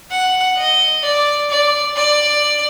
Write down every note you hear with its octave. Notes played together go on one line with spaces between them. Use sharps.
F#5
D#5
D5
D5
D5